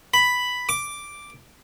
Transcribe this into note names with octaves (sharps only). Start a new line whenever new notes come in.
B5
D6